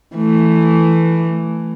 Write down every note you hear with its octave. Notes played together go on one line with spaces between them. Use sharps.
E3 A3